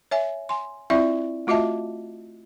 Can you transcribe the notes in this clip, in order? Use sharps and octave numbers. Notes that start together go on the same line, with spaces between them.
C#5 E5 G#5
G#5 C6
C4 E4 F4 D5 E5 C#6
A3 F4 F#4 D#5 E5 A5